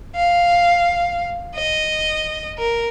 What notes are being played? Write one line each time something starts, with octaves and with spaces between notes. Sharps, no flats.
F5
D#5
A#4